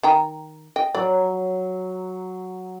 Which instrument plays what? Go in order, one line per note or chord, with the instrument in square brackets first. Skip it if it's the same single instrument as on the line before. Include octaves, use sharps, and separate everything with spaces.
[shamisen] D#3 G5 A#5
D#5 G5
[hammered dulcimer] F#3 [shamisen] D5